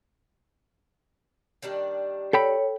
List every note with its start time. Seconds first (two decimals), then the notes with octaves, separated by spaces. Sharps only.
1.62 D#3 G3 D4
2.33 A4 C#5 G5 B5